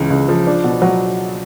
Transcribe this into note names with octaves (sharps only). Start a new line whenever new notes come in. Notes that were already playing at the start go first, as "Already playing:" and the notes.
Already playing: C#2 C#3 E3
C#2
F3
D4
B2
F#3